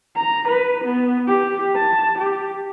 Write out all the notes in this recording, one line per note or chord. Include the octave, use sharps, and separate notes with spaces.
A#5
B4
B3
G4
A5
G4